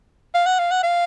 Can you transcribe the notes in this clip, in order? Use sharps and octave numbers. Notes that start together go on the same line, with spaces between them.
F5
F#5
F5
F#5
F5